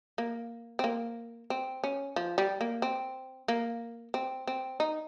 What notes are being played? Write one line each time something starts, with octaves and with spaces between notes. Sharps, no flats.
A#3
C4
A#3
C4
C#4
F3
G3
A#3
C4
A#3
C4
C4
D#4